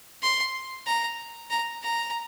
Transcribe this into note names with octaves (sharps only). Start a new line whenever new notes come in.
C6
A#5
A#5
A#5